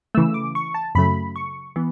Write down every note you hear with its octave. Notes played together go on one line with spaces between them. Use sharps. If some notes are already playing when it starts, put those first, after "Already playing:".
C#3 E3 A3 E6
D6
C#6
A5
F#2 C#3 F#3 A3 B5
C#6
E3 B3